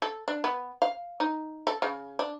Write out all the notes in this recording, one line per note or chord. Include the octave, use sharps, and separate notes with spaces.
A4
D4
B3
F5
D#4
A4
C#3
D4